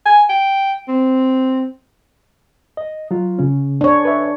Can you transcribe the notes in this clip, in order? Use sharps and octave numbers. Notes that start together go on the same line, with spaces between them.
G#5
G5
C4
D#5
F#3 F4
C#3 C#4
D4 C#5
B4 E5